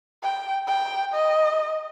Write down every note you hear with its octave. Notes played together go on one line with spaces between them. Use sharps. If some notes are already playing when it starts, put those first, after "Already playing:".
G5
G5
D#5